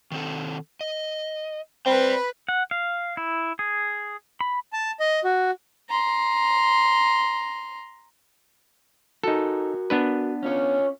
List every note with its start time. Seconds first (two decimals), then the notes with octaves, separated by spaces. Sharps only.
0.12 D#3 C4 A4
0.81 D#5
1.86 C4 B4 D5 G5 B5
2.49 F#5
2.71 F5
3.17 E4
3.59 G#4
4.41 B5
4.73 A5
5.00 D#5
5.24 F#4
5.90 A#5 C6
9.24 D#4 F#4 A4 A#4
9.90 B3 D4 B4
10.43 C#4 F4 C#5